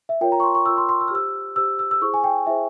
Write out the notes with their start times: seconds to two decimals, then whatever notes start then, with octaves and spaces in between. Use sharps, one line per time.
0.09 E5
0.21 F4 A#4 C#5 G5
0.32 A#5
0.40 C#6
0.43 C6
0.55 C#6
0.66 F4 A#4 C#5 E6
0.78 C6
0.89 C6
1.01 E6
1.08 F6
1.11 G4 C5 E6
1.56 G4 C5 E6
1.79 E6
1.91 E6
2.02 E4 G#4 C5 C#6
2.14 G#5
2.24 G5
2.46 E4 G#4 C5 E5